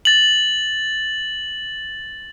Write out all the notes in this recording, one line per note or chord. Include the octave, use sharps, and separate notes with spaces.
A6 F#7